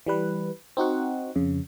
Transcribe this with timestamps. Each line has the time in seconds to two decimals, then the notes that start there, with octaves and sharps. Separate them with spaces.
0.07 E3 G3 B4
0.77 C4 D#4 F#4 F#5
1.36 F2 C#3